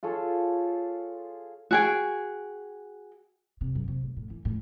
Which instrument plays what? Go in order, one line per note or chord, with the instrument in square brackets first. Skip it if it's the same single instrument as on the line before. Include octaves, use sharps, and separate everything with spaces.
[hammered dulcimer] F4 G#4 A4 C#5
[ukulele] F#4 G#4 G5
[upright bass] C3
F#2
C3
A2
A2
E3
A2